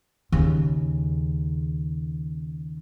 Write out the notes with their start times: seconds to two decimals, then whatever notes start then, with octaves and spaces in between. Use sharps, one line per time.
0.32 D#2 C#3